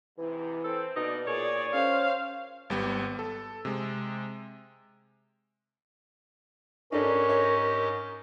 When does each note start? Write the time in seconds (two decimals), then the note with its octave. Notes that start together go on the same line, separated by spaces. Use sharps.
0.18 G#2 C3 E3
0.64 C4 A4 C5
0.96 B2 A#3 B3 D#4 D5
1.27 A#2 G#4 C#5 D5
1.74 C#4 C5 F5
2.70 G#1 G3 B3
3.19 A4
3.65 C3 G#3
6.92 G#2 C#4 D4 G4 A4 A#4 D#5
7.29 C#5